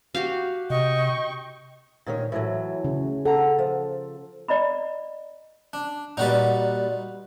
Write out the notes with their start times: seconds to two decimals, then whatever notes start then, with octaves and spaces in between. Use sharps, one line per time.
0.15 F#4 G4 F5
0.70 C3 D#5 G5 C#6
2.06 A#2 D#3 C#5
2.32 A2 E3 F#3
2.84 C#3
3.25 A4 F#5 A#5
3.59 F3
4.48 D5 D#5 A#5 B5
5.73 D4
6.17 A#2 G3 D#4 F#4 B4